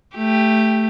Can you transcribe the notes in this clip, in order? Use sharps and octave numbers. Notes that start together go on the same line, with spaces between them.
A3 G4